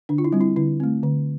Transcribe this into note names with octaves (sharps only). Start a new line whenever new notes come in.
D3 D4
F4
E4
G3 C4
E4
D3 E4
A3 C4
D3